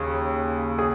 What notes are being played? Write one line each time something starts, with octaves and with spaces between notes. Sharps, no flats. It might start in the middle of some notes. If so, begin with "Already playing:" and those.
Already playing: D#2 C#3
G#4